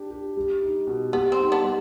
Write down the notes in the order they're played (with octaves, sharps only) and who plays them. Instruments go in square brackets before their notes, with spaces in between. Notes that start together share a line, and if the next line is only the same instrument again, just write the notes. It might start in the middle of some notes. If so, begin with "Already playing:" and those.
Already playing: [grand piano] D4 G4
G4
G3
D#4
B2
[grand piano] G3 [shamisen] B3
[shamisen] C4
[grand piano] D#4
[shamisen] B3 D4
[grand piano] G3